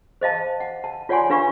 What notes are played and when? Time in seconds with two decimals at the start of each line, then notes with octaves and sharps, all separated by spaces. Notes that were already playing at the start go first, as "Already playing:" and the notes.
0.21 C5 D#5 F5 A5
0.60 F#5
0.84 A5
1.09 F4 C#5 D5 F#5 G#5 C6
1.30 D4 B4 F5 B5 C#6